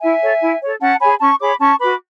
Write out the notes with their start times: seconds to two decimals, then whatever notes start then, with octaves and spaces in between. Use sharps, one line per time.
0.01 E4 E5 G#5
0.21 A4 C#5
0.41 E4
0.61 A4 C#5
0.81 C#4 F#5 A5
1.01 G#4 C#5 G#5 B5
1.21 C#4 A5 C#6
1.41 G#4 C#5 B5 D6
1.60 C#4 A5 C#6
1.80 F#4 B4 B5 D6